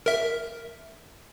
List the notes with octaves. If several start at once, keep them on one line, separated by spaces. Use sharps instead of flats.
A#4 E5